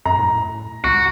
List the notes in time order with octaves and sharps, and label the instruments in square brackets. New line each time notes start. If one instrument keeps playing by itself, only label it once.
[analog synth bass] F#2 [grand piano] A#5
[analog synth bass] A2
[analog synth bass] C#2 [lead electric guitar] F#4